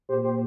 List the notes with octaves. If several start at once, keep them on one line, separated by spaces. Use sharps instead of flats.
A#2 G4 C5
A#2 G4 C5